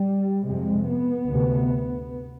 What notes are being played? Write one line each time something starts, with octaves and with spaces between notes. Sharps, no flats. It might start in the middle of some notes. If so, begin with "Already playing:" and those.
Already playing: G3
F2 C3 G#3
B3
D2 C3